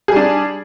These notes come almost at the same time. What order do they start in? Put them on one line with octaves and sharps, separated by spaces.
G#4 G3 D4